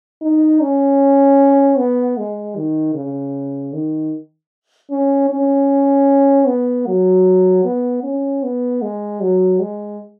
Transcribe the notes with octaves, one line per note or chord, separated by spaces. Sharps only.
D#4
C#4
B3
G#3
D#3
C#3
D#3
C#4
C#4
B3
F#3
B3
C#4
B3
G#3
F#3
G#3